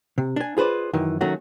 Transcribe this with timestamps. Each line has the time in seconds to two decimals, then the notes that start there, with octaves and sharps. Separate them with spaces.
0.18 C3
0.36 D4 G#5
0.57 F4 G#4 B4 C5 D5
0.93 F#2 D#3 E3
1.21 D#3 F#3 A3 C#4 F#4